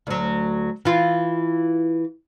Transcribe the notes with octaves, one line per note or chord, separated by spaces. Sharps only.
D2 F#3
E3 F4